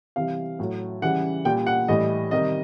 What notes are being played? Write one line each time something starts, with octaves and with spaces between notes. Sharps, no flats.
C3 E3 G3 F5
A2 F#3
C#3 E3 G3 F#5
A#2 G3 G5
F#5
A2 E3 G3 D#5
C3 D#3 G3 D#5